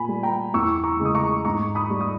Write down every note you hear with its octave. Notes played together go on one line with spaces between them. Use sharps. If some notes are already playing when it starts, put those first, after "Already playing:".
Already playing: A#2 G#5 B5
G3
G5 A#5
E2 C#6 E6
A#5 C#6
C#3 G#3
D#6
A#5 C#6
G#2 A#5 C#6
B5 D#6
G3
D#6